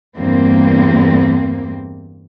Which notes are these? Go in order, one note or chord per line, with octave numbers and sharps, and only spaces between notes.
E2 G2 A#3 C4